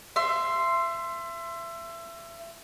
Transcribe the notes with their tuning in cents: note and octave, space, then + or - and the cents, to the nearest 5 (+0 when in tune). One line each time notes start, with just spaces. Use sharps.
E5 +30 C6 +0